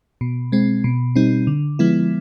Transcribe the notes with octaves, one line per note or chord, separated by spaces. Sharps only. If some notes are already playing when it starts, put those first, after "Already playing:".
B2
G#3 C4
B2
G3 C4 D#4
D3
F3 G#3 B3 E4